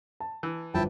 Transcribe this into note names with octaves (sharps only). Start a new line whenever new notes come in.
A5
E3
G1 F3 E4 G5 A5